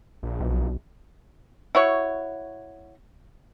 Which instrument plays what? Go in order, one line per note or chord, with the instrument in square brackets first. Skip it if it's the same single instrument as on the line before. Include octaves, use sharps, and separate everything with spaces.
[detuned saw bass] A#1
[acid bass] B1
[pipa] E4 F#4 C#5